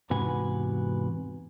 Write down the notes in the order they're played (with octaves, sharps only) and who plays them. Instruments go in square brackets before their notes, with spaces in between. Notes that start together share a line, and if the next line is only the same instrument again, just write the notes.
[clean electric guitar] E2 G#2 C3 F#4 B4 G#5